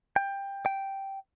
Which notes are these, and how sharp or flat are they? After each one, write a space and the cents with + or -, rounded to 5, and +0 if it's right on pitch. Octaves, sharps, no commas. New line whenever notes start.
G5 +15
G5 -5